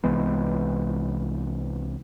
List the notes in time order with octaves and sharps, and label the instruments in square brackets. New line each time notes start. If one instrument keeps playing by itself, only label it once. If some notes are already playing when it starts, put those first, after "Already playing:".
[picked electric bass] C2 E3 G#3 B3